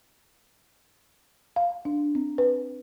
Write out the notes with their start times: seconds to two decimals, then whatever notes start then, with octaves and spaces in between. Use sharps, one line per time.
1.56 F5
1.85 D4
2.15 C4
2.38 B4